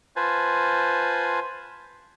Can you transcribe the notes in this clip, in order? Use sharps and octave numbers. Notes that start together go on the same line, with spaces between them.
F4 B4 C5 G#5 A5